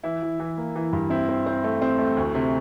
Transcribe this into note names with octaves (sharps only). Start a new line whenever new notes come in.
E3 E4
E3
E3
A#3
E3
G2
C4 E4
C4
C4
A3
C4
A3
D2
C3